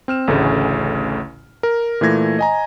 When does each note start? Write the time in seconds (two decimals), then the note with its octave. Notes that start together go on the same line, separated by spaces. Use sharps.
0.08 C4 F6 E7
0.28 A1 D2 C#3 A3 C#4
1.63 A#4
2.01 A#2 E3 A3 G#6 A#6
2.39 D#5 G#5 A#5